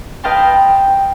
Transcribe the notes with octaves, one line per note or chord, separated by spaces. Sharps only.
B4 D#5 F5 G5 A5 C6